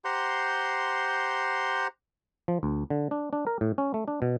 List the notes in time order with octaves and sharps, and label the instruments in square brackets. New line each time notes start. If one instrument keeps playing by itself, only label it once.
[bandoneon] G4 C5 F#5 A#5 C6 G6
[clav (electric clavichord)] F3
D2
D3
D4
D4
A#4
A2
C#4
A3
D4
B2